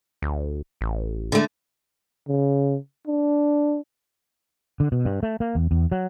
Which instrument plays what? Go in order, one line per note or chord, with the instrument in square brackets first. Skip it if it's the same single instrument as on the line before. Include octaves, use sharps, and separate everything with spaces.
[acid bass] D2
A1
[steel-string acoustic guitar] D3 A3
[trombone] C#3
D4
[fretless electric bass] D3
B2
G2
A3
A#3
E2
E2
F#3